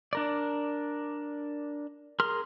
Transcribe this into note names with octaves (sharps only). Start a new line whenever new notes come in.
D4 A#4 D5
G#4 A#4 C6 F6